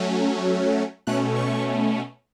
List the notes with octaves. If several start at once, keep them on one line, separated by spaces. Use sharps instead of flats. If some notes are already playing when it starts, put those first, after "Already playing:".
Already playing: F#3 A3 C#4
B2 A3 C#4 F#6
C#6